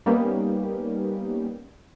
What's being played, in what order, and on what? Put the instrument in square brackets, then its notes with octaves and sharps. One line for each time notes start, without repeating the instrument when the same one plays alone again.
[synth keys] G3 A#3 B3 C#4 D#4 G4